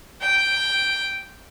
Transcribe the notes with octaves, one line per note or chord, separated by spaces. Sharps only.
G5